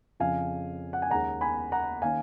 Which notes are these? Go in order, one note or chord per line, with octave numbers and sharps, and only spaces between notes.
F2 C#3 F3 F5 G#5
F#5
G#5
D#2 D#3 G#3 C#4 F#5 A#5
G#5 B5
F#5 A#5
D#3 A#3 C#4 F5 G#5